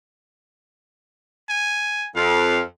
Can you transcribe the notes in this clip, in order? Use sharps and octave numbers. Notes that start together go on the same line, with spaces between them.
G#5
F2 F5